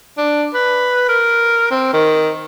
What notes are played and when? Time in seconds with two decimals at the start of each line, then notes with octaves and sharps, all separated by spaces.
0.18 D4
0.54 B4
1.09 A#4
1.71 C4
1.94 D#3